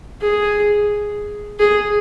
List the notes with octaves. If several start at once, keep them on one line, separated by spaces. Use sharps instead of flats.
G#4
G#4